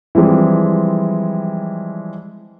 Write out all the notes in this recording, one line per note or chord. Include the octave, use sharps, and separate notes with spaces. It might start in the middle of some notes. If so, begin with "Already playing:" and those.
E3 F3 G3 G#3 C4